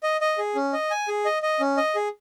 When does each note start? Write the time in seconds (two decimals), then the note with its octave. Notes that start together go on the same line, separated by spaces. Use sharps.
0.03 D#5
0.21 D#5
0.38 G#4
0.55 C#4
0.73 D#5
0.91 G#5
1.08 G#4
1.25 D#5
1.43 D#5
1.60 C#4
1.77 D#5
1.95 G#4